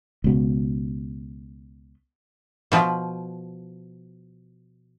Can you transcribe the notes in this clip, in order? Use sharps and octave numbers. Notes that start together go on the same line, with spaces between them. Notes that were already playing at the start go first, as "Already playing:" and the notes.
C#2 B2
B2 F3